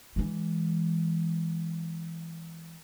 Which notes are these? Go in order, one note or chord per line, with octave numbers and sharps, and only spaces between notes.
E3 G#3